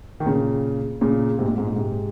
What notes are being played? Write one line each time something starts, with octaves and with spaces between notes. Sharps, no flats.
D#3
A#2 C#3
A#2 C#3
G#2 C3
A#2
G#2
A#2
G#2 C3